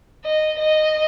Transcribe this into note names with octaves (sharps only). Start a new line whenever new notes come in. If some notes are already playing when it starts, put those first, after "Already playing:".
D#5
D#5